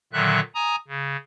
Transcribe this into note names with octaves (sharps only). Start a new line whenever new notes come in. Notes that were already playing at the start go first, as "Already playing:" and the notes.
A#2 D3 D#3 F#3 E5 F#6
G#5 A#5 D#6
C#3